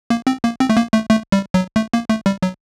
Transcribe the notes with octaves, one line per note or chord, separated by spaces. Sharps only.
A#3
C4
A#3
C4
A3
A#3
A3
A3
G3
F#3
A3
A#3
A3
G3
F#3